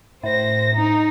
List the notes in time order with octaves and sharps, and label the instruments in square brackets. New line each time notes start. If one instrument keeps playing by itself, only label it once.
[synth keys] A2 [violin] C5 A#6
[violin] D#4